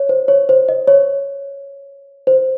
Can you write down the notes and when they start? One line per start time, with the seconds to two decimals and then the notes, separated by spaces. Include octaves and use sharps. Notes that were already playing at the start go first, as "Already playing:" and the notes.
Already playing: C#5
0.09 C5
0.28 C#5
0.49 C5
0.69 D#5
0.88 C#5
2.27 C5